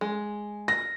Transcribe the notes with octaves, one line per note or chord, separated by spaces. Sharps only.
G#3
A#6